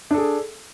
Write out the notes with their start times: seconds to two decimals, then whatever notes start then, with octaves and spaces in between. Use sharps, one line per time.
0.11 D4
0.14 A4
0.18 G#4